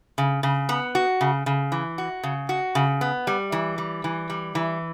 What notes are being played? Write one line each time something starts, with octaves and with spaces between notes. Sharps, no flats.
C#3
C#3
B3
F#4
C#3
C#3
E3
F#4
C#3
F#4
C#3
B3
G3
E3
G3
E3
G3
E3